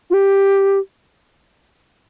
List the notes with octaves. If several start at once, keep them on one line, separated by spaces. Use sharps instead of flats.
F4
G4